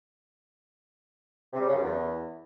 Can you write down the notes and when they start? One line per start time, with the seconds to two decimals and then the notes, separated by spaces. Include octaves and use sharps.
1.53 C3
1.60 G3
1.67 C#3
1.74 F#2
1.80 E2